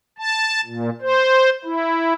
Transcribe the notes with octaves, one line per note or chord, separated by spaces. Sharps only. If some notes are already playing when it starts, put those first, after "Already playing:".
A5
A#2
C5
E4